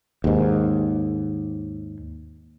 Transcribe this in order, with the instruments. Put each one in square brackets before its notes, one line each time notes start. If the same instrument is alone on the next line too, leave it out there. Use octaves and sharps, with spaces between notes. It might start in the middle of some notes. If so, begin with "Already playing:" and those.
[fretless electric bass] D#2 G#2